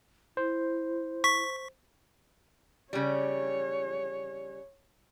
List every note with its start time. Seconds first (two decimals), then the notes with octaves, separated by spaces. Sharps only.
0.37 E4 C5
1.24 C#6 B6
2.93 C#3 G3 C#5